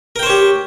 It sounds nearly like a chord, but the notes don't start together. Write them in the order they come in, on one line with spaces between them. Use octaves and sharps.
A#4 G5 C5 C#5 G4